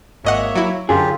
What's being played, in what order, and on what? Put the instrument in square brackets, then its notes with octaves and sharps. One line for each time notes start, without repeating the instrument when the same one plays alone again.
[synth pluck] G#1 D#5 F#5 [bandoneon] A#3 C#5 E5
[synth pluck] F#3 E4
[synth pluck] F#2 [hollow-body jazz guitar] D3 G#4 [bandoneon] F#3 F4 G4